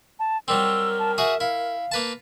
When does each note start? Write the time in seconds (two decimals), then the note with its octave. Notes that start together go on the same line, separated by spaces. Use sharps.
0.19 A5
0.48 F#3 G3 C4 A#4 E6
0.99 A5
1.18 F#4 G#4 E5
1.40 E4 F5
1.91 A#3 B4 A5